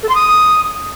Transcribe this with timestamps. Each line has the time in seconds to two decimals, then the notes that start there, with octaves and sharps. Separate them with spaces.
0.03 A4
0.09 C6
0.15 D#6